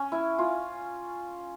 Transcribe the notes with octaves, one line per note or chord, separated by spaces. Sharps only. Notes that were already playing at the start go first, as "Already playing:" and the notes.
Already playing: C#4
E4
F4